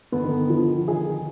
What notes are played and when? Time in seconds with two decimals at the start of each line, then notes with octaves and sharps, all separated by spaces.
0.12 D3 B3
0.22 D#3
0.31 D3
0.50 D#3 F3
0.88 D#3 G#4